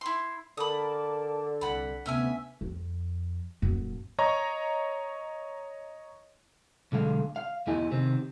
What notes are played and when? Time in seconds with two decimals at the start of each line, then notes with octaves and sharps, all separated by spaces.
0.01 E4 C6
0.57 D3 A#4 A5 B5 D6 D#6
1.61 C2 F#5 B5
2.06 D2 C3 B3 C#4 E5 G#5
2.61 F2
3.62 D#1 F#2
4.19 C#5 D#5 A#5 C#6
6.92 B1 D3 G#3 F5
7.36 F5
7.67 E2 B3 E4 G4 D#5 G#5
7.91 C3 D#3 C4